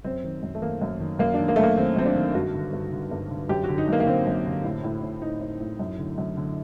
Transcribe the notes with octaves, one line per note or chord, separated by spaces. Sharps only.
F#2 C4
D#3
F#2
A3
D#3 A#3
F#2
D#3
F#2 A#3
D4
D#3
A#3
F#2 A3
A#3
D#3 C4
F#2 C4
D4
D#3
G2 F#4
D3
G2
D3
G2
D3
F#2 G4
D3 F#4
D#4
F#2 A#3
A#3
D3 C4
F#2
D3
A2
A2
A2
A2 D#4
A2
A2
F#2
D3
F#2
D3